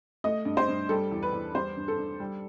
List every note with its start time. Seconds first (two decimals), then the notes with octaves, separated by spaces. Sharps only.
0.24 A3 D#5
0.45 G2
0.57 C5
0.68 G2
0.89 G3 A4
1.11 E2
1.23 B4
1.33 E2
1.54 G3 C5
1.77 G2
1.88 A4
1.98 G2
2.20 G3